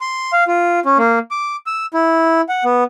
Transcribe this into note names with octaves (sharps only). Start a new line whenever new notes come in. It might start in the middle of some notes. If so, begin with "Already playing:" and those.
C6
F5
F4
C#4
A#3
D6
E6
E4
F#5
B3